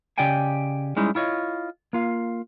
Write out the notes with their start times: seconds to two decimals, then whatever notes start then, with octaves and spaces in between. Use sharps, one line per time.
0.18 C#3 G4 D5 D#5 G5 G#5
0.96 G3 G#3 C#4 D#4 E4
1.15 E4 F4 C#5 D#5
1.93 A#3 F4 F5